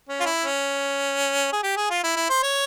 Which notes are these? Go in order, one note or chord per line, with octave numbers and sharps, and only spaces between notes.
C#4
F4
E4
C#4
G#4
G4
G#4
F4
E4
E4
C5
C#5